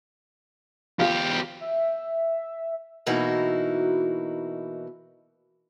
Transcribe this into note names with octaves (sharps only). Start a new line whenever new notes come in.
E2 F4 G4
E5
B2 E3 A#3 D#4 E4 F#4